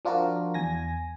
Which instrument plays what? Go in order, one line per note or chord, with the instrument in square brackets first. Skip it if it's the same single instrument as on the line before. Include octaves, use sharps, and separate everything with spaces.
[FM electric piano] F3 D4 F4 F#4 A#4
E2 G#5 A#6